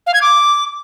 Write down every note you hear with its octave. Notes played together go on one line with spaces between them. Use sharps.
F5
G#6
D6